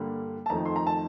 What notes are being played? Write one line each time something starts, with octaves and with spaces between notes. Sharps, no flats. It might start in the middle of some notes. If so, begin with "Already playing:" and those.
Already playing: G2 D3 G3 A#3
A5
F2 D#3 A3 D#4 A#5
C6
A#5
A5